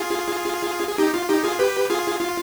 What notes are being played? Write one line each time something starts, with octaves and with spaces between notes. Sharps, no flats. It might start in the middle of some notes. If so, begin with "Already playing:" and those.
Already playing: F4 G#4
G#4
D#4 G4
F4
D#4 G4
F4 G#4
G4 B4
F4 G#4
F4